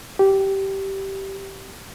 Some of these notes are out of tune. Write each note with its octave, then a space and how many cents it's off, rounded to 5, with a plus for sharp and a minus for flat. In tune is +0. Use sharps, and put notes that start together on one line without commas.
G4 -15